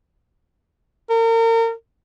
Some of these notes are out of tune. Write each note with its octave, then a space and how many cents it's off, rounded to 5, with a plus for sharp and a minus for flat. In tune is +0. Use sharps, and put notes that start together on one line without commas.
A#4 -35